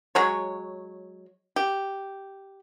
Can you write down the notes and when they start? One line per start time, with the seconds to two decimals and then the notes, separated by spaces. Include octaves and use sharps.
0.15 F#3 G#3 C#5
1.56 G4